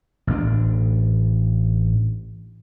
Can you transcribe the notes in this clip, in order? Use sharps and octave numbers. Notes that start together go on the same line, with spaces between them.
A1 A2 D4